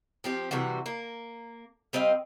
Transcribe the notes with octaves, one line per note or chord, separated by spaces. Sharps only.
F3 C4 G4
C3 E3 G3 F#4
A#3
G3 C4 D#5 F5